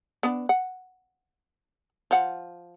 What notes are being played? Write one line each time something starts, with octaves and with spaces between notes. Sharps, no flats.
B3 D4
F#5
F3 F#5